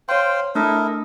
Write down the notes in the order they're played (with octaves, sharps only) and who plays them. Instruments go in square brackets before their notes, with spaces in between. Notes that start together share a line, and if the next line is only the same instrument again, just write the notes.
[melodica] C5 F5 G5 [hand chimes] C#5 C6
[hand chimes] A3 D4 D#6 [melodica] E4 A4 A#4